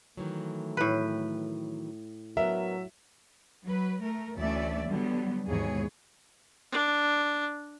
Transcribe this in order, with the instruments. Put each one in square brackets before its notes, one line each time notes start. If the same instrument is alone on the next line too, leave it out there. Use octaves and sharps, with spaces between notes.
[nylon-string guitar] D#3 E3 F#3 [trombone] A3
[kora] A2 B4
[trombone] F#3 [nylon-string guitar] B3 D4 A#4 [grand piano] E5
[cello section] F#3 B4
A3 A#4
D2 E3 A3 C#4 D5 E5
D3 F#3 G3 B3
D#2 G#2 B2 E3 G#4 C#5
[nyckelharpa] D4